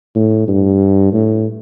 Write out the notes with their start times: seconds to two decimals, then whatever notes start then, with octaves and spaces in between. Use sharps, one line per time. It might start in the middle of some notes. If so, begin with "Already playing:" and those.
0.15 A2
0.48 G2
1.13 A2